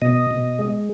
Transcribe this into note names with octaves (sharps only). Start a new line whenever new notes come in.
B2 D#5
B2
G#3